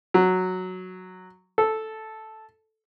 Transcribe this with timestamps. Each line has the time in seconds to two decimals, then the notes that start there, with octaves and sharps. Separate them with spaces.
0.14 F#3
1.58 A4